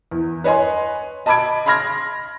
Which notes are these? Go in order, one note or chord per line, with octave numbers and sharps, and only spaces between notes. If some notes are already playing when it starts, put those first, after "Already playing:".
E2
B4 C#5 D#5 G#5 C6
D#5 A5 B5 D6 G#6 D7
B5 C6 F6 G#6 A#6